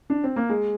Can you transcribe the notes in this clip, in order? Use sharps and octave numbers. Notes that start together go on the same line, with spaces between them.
D4
C4
A#3
G#3